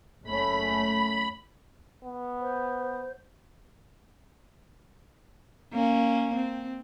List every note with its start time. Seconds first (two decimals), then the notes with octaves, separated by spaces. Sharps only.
0.24 F#1 A3 C#4 B5
2.04 B3
2.40 C5
5.73 A#3 C#4
6.34 C4